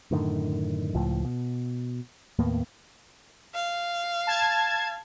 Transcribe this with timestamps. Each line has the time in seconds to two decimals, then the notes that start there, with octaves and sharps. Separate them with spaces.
0.11 F#2 A2 D3 D#3
0.95 C#2 A2 F3
1.25 B2
2.39 D#2 A2 A#3 B3
3.54 F5
4.27 A5 G#6